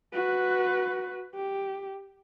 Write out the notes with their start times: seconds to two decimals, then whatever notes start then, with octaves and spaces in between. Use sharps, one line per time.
0.13 F#4 B4
1.35 G4